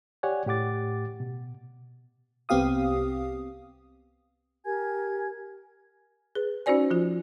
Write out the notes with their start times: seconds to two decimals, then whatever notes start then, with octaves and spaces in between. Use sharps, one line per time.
0.23 G4 C#5 D5 F#5 G#5
0.46 A2 G4 F#5 D6 A6
1.20 B2
2.49 C2 B3 C4 G4 F5 D#6
4.66 G4 A#4 G#5 G#6
6.35 G#4 B4
6.66 C#4 D#4 F#4 C5 D5 G#5
6.91 F3 F4